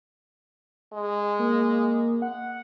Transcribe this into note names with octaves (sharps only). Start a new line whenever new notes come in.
G#3
A#3
F#5